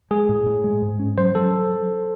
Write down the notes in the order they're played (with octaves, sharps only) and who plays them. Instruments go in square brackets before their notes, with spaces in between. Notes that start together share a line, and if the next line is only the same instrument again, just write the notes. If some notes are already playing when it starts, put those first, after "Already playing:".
[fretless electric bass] G#3 [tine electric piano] G#4
[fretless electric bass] A2
A2
G#3
G#2
C#4
[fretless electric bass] F#3 [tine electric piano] C5
[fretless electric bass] F#3 [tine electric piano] A4